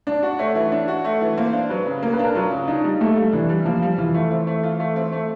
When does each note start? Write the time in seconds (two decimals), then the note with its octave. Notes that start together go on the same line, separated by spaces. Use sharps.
0.07 D4 D5
0.23 F#4
0.39 A3 C#5
0.55 E3
0.72 D4
0.88 F#4
1.05 A3
1.21 E3
1.38 A#3 C5
1.53 D4
1.69 F#3 B4
1.86 C#3
2.03 A#3 A#4
2.13 B4
2.19 D4 A#4
2.35 F#3 F4
2.51 C#3
2.68 D4 D#4
2.84 G3
3.01 A3 A#3
3.17 G3
3.33 E3 D4
3.49 G3
3.65 F3 A#3
3.82 G3
3.98 E3 F4
4.14 A3
4.31 C4
4.47 A3
4.63 F4
4.80 A3
4.96 C4
5.13 A3